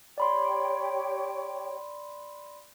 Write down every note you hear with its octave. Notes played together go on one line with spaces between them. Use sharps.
G4 C#5 D5 G5 B5 C6